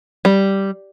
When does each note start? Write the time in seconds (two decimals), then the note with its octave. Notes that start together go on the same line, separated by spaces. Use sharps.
0.25 G3